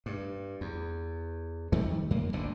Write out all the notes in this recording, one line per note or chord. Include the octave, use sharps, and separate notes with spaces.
G2
E2
F2 D#3 G3 A3
F#2 A#3
F#1 D2 A#2 D3